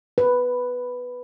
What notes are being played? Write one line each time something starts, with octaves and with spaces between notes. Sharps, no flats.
B4